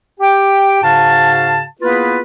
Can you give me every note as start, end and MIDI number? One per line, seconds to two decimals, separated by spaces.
0.20 0.82 67
0.20 0.82 79
0.82 1.64 44
0.82 1.64 49
0.82 1.64 66
0.82 1.64 77
0.82 1.64 81
1.81 2.21 58
1.81 2.21 59
1.81 2.21 64
1.81 2.21 65
1.81 2.21 68
1.81 2.21 71